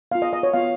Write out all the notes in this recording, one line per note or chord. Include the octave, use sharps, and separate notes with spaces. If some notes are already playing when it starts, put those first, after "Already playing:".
B3 F4 F5
D#5
D#5
C#5
B3 F4 F5